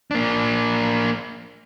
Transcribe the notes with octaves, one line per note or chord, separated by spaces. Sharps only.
A#3 D4